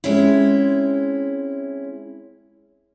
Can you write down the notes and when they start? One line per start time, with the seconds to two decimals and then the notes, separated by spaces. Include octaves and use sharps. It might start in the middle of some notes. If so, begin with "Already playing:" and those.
0.04 G#3 C4 C#4 E4